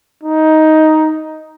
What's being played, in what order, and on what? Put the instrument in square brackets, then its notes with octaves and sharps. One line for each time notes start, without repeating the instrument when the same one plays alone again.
[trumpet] D#4